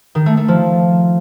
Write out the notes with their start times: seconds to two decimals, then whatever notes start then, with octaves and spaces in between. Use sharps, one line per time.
0.15 D#3
0.26 A3
0.37 A3
0.48 F3